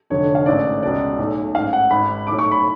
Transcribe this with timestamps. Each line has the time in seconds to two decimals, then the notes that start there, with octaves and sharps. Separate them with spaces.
0.10 F1 F2 D3 C#5
0.35 F5
0.46 A1 G#2 D5
0.82 C#2 B2 D5
1.18 B1 A2
1.55 A1 G#2 F5
1.73 F#5
1.91 G#1 G#2 B5
2.27 B1 A2 D6
2.39 C#6
2.51 B5